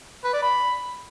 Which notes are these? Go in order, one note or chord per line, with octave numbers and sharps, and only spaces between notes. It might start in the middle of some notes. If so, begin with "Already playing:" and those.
B4
D5
B5